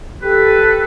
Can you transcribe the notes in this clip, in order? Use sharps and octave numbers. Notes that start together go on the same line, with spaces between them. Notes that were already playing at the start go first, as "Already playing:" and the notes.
G4 A4 B4